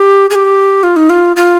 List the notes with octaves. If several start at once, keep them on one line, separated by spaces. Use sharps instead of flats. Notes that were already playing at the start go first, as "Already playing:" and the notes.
Already playing: G4
G#4
G4
F4
D#4
F4
F4